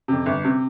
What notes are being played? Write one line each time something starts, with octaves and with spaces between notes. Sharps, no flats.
F2 C3
G1
C3